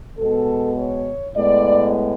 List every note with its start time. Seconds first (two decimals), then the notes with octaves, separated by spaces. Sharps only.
0.18 B2 G#3 B3 A4
0.76 C#5
1.35 A2 G#3 B3 D5